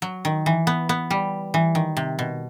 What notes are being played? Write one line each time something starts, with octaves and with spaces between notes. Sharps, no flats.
F#3
D#3
E3
B3
B3
G3
E3
D#3
C3
B2